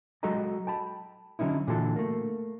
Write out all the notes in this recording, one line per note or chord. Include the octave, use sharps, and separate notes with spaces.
F#3 G#3 F#4 A4 D#5 A#5
G5 A5 B5
D3 F#3 C#4 D#4 E4
A#2 D3 E3 F4 F#4 A4
A3 A#3